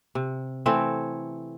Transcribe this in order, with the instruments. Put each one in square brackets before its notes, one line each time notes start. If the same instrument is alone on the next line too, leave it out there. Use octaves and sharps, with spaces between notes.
[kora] C3
E3 A3 C4